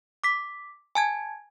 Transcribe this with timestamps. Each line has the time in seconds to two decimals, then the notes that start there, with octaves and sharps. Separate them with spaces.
0.24 D6 B6
0.95 G#5 A5 G#6